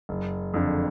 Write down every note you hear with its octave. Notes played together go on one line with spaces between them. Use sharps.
F#1
F2 D3